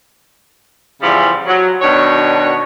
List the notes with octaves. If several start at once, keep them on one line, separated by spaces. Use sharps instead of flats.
E2 C#3 E3 F3 G3
F#3
B2 D#3 D4 C#5